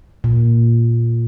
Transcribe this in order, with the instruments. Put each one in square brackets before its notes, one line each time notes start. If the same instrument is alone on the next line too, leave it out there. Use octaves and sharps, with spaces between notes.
[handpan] A#2